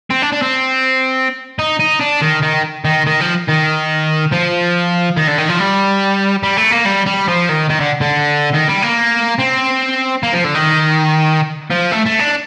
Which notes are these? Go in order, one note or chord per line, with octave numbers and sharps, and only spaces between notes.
C4
D4
D4
C4
D#4
D#4
D4
D#3
D#3
D#3
D#3
F3
D#3
F3
D#3
D3
D#3
F3
G3
G3
A3
A#3
G3
G3
F3
D#3
D#3
D3
D3
D#3
G3
A#3
C4
A#3
F3
D3
D#3
F3
A3
A3
D4